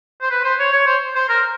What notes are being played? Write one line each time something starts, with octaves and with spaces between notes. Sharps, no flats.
C5
B4
C5
C#5
C#5
C5
C5
A#4